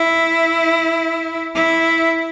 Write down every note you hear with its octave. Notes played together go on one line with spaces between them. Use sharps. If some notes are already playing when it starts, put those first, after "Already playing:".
Already playing: E4
E4